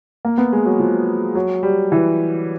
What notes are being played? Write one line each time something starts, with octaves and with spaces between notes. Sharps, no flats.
A#3
B3
G#3
F#3
F3
F#3
G3
E3